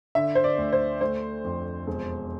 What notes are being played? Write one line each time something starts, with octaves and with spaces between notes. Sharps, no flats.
D3 E5
C5
D5
D2
C5
A3 C5
F2
E1